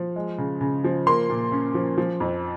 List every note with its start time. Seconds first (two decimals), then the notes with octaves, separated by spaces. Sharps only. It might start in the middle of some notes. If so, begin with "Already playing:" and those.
Already playing: F3
0.16 G#3
0.38 C#3
0.61 C#3
0.84 F3
1.07 A#3 C6
1.30 A#2
1.52 C#4
1.74 F3
1.98 F3
2.20 F2